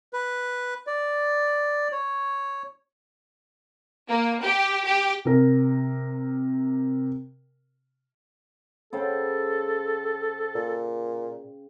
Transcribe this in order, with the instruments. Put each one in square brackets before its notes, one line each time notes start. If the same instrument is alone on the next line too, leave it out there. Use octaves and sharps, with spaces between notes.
[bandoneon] B4
D5
C#5
[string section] A#3
G4
G4
[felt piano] C3 A#4
[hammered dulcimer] C#3 C5 G5 [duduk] A4
[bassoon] A#2